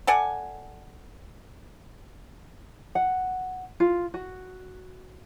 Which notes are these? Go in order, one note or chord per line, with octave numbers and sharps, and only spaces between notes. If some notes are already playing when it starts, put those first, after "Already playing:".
A4 D5 F#5 G#5
F#5
F4
F#4